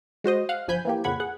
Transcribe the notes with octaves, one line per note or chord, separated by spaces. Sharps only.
G#3 F#4 C5 D#5
F5 F#5
G1 F3 G#5 B5 G6
E3 A#3 G4
F2 A#2 C#3 F#5 B5 G#6
G#4 F#5